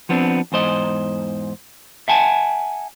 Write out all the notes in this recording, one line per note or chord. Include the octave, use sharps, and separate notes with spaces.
F3 B3 C4 D4
E2 G#2 C5 D#5
E5 F#5 G#5 A5